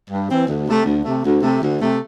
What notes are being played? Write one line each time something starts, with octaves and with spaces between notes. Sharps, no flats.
G2
E3 C4
D2
C3 A3
D2
C3 A3
D2
C3 A3
D2
C3 A3